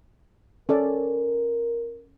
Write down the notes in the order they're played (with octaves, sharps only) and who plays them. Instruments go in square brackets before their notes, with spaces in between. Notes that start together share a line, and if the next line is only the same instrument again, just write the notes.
[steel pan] C#4 A4 D5 [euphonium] A#4